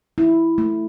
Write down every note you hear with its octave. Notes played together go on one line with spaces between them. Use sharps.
E4
A3